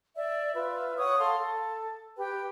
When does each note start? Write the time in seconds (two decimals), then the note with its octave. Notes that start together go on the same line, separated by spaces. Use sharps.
0.17 D5 E5
0.55 F4 B4 E5
0.98 C#5 F#5 C#6 D#6
1.18 A4 F5 C6
1.38 A4
2.17 G4 B4 G5